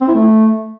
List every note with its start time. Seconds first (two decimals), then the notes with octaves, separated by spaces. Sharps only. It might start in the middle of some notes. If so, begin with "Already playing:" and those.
0.01 C4
0.08 E4
0.15 A3